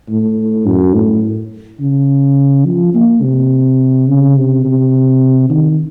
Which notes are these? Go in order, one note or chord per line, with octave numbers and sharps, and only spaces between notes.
A2
F#2
A2
C#3
F3
A#3
C3
C#3
C3
C3
D#3